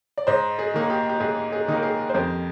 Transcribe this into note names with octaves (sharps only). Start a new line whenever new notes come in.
D5
G#2 C5 D#5
G#4
D#3 A#3 D#4
G4
G4
G#2 G#4
G#4
D#3 A#3 D#4
A#4
G#4
C5
F2 G4 A#4